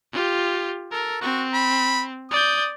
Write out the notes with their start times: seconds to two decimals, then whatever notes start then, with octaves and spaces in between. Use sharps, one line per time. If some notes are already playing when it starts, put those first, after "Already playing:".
0.12 F4 G4
0.91 A4 A#4
1.21 C4 F#4
1.53 B5
2.31 D5 D#6 G6